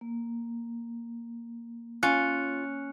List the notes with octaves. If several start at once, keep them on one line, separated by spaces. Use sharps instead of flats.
A#3
C#4 F4 F#6 C#7